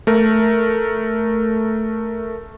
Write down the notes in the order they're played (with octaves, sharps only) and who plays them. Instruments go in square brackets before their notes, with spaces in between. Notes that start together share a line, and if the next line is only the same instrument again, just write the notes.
[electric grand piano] A3 A#4